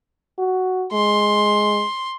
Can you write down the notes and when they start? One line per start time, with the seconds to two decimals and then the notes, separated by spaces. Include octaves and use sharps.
0.39 F#4
0.93 G#3 C6